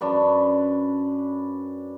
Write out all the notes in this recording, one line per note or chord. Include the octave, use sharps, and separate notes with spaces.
F#2 D4 B4